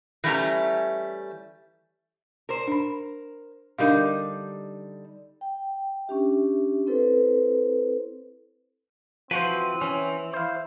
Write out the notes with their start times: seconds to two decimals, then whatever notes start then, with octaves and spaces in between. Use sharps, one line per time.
0.24 E3 G3 A3 C#4 E5 A#5
2.49 A#4 C5
2.67 D4 B5
3.78 D3 G3 D4 D#4 A#4 F5
5.41 G5
6.07 C#4 D4 G4 E5
6.87 C4 E4 A4 B4 C5
9.31 E3 F3 C4 F#4 B4 C5
9.81 E3 C#4
10.33 E4 C5 F5